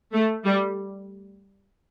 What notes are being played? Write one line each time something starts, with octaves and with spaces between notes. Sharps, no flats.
A3
G3